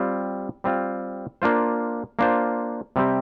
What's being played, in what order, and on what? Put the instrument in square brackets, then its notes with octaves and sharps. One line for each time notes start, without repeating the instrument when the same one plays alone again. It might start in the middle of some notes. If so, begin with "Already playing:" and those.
Already playing: [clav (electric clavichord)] G3 C4 F4
G3 C4 F4
A#3 D4 F4 C5
A#3 D4 F4 C5
C3 G3 C4 G4